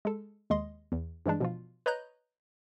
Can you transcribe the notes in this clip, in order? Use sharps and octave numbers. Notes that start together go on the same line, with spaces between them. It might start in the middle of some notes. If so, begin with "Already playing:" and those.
G#3 A4
D#2 G#3 D#5 C6
E2
G2 E3 G#3 D4
B2 F3 F4
B4 C#5 D#5 A#5 F#6 G6